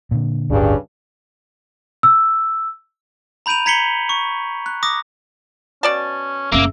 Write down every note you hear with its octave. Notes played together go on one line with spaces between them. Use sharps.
A#2 D3
D1 G1 G2 C#3
E6
A#5 B5 G6 D7 D#7 F7
A#5 G#6 B6 C#7 F#7 G7
C#6
F#6
D6 D#6 A#6
B2 C#4 D5 A5
F#1 C#3 A#3 E5